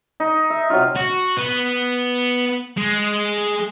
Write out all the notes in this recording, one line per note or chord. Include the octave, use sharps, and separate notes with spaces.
D#4
E5
C3 F#3 D#4 F4
F#4
B3
G#3